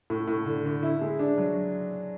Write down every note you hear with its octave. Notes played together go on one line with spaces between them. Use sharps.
A2
A2
D3
D3
E4
G#3
D4
F#3